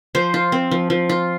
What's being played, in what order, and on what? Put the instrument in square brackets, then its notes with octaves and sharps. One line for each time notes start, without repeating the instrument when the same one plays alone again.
[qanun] F3 C5
F4
C4
F3
F3
F4